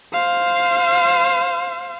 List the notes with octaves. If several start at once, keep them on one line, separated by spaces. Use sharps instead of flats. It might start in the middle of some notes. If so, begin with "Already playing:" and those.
C5 F5